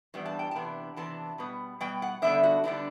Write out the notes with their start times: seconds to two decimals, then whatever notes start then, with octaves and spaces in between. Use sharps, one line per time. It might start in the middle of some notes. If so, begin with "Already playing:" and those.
0.14 G2 E3 G3 B3 D4
0.26 A5
0.39 G5
0.51 A5
0.55 C3 E3 B3 D4
0.96 C3 E3 B3 D4 A5
1.38 B2 G3 B3
1.80 B2 G3 B3 G5
2.02 F#5
2.22 D3 G3 B3 D4 E5
2.43 F#4
2.64 D3 G3 B3 D4 E4